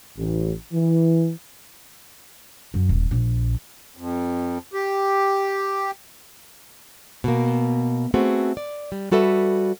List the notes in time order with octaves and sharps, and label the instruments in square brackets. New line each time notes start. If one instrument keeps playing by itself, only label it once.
[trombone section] A1
E3
[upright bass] F#2
D#1
A#1
[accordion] F2
G4
[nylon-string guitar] B2 A#3
A3 B3 C4 F#4 G#4
D5
G3
G3 F#4 A4 B4 E5